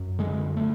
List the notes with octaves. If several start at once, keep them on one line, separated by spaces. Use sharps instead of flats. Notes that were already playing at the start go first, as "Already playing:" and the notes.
Already playing: F#2
D3 G#3
A3